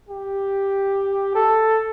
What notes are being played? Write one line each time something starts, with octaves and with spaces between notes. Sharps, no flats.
G4
A4